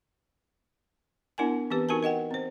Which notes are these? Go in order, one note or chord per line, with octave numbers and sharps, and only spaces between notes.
B3 D4 E4 A#4 F#5 G#5
E3 B3 C4 G4 B4
D#4 F#4 A#4 G#5 A5
A#4 D#5 F#5 G5
C4 C5